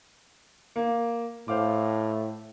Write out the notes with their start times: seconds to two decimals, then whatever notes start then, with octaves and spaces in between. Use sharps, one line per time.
0.76 A#3
1.48 A2 C5 F5 D6